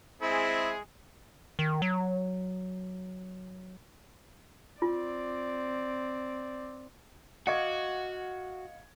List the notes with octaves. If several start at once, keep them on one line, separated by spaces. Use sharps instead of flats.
G#3 C4 E4 G#4
D#3
F#3
C4 F4 D5
F#4 D#5 F5 F#5 C#6 D6 G#6